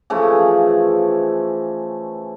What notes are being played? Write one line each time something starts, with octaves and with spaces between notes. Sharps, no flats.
C#3 E3 F3 A3